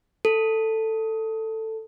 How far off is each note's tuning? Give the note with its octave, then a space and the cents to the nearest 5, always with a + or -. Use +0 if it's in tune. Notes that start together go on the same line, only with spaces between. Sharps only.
A4 +10